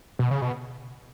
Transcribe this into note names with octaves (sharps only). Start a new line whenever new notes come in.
B2
C#3
B2